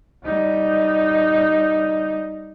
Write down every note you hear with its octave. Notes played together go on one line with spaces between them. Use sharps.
G3 D#4